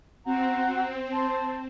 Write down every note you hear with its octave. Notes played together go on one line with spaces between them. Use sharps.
C4 F#4 F#5 A#5
C5 A5